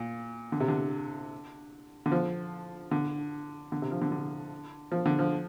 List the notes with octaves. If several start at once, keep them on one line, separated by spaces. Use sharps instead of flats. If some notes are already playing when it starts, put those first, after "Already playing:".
Already playing: A#2
D3
C3
D3
D3
F3
D3
D3
C3
F3
D3
D3
F3
D3
F3